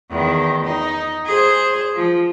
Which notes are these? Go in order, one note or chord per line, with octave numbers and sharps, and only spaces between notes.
E2 D#3
D#4
G#4 C5
F3